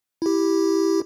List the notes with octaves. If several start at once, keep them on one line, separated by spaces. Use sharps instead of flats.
E4 G4